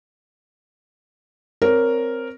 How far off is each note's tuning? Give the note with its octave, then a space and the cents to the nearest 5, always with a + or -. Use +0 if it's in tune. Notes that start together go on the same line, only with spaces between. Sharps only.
C4 +0 A#4 +0 C#5 +20